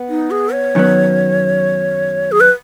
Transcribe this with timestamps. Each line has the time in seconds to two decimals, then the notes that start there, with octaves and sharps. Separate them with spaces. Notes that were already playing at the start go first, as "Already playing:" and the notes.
Already playing: B3
0.09 D#4
0.31 G#4
0.53 C#5
0.75 F#2 D#3 F#3 B3
2.32 G#4
2.40 B4